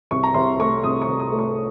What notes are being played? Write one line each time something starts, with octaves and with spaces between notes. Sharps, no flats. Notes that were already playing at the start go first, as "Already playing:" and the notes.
C2 C#6
A#5
C2 C6
A3 C#6
C2 D#6
C#6
C2
D#6
A3
C#6